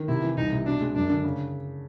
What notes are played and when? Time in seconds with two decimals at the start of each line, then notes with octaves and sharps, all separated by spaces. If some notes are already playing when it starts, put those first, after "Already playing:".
Already playing: D#3
0.08 C3 E4
0.23 E3
0.37 C2 D#4
0.52 C3
0.66 B2 D4
0.81 G#3
0.95 F#2 D4
1.09 D3
1.24 C#3